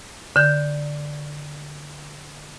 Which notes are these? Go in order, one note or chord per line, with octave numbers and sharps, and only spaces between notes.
D3 G6